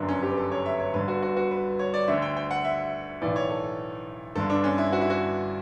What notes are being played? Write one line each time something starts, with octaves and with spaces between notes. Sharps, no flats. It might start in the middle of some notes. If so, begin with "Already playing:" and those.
Already playing: G1 F#2 D3 D4
C#4
G4
B4
A4
C#5
E5
C#5
G1 G2 D3 B4
F#4
F#4
F#4
B4
C#5
D5
D2 D3 E5
G5
G5
F#5
E5
B1 A2 E3 D5
C#5
A4
G1 G2 D3 A4
D4
C#4
E4
F#4
E4
F#4